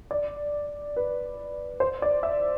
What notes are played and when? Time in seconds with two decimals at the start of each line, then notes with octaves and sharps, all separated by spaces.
0.11 D5
0.96 B4
1.80 C5
2.02 D5
2.23 E5